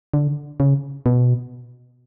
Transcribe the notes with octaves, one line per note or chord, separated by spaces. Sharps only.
D3
C#3
B2